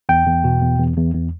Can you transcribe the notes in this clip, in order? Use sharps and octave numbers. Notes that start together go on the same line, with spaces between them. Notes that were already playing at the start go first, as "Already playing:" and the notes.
E2 G5
E2
B2
E2
E2
E2
E2